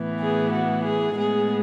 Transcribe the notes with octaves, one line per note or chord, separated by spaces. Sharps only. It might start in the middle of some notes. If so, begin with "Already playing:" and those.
Already playing: A2 E3 B3
G#4
F#4
G#4
A2 G#3 B3 G#4